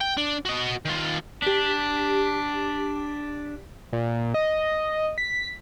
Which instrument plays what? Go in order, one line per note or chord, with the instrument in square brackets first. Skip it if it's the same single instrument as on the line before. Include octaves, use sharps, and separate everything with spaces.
[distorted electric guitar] G5
D4
F#4 D#5
D#3 F4
[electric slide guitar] D4 [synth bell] G4 B6
[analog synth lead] A#2
D#5
B6